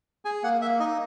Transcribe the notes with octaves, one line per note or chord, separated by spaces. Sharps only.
G#4 G#5
A#3 F#5
A#3 E5
D#4 D#5